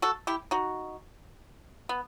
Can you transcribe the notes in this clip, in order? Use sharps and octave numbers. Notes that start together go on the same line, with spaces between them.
F#4 A4
E4 G4
D#4 F#4
B3